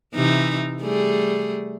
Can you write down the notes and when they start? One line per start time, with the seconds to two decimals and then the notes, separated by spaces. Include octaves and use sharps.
0.14 C3 E3 D#4
0.81 G3 A3 G#4